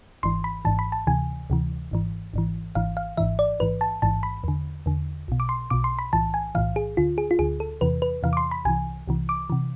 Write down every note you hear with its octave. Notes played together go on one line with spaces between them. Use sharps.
G#1 G#2 E3 C6
B5
G#1 G#2 E3 A5
B5
A5
D2 C3 E3 G#5
D2 C3 E3
G#1 G#2 E3
G#1 G#2 E3
G#1 G#2 E3 F5
F5
G#1 G#2 E3 E5
D5
A1 G#2 E3 B4
A5
A1 G#2 E3 A5
B5
E2 D3
E2 D3
B1 B2
D6
C6
B1 B2 D6
C6
B5
B1 A2 E3 A5
G#5
B1 A2 E3 F5
G#4
D2 D3 F4
G#4
F4
D2 D3 G#4
A4
E2 C3 E3 B4
B4
E2 C3 E3 F5
D6
C6
B5
C2 C3 E3 G#5
C2 C3 E3
D6
C3 E3